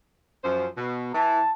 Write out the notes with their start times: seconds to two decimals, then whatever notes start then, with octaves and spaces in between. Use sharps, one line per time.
0.44 F#2 F3 C5
0.77 B2
1.14 E3 A5